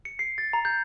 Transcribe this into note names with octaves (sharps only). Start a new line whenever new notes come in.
C#7
C7
A6
A#5
G6